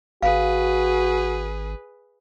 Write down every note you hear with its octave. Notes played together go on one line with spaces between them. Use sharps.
G#1 F#4 G#4 B4 F5